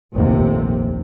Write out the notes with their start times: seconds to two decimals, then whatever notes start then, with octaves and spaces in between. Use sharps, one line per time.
0.15 F1 A#1 D#2 C3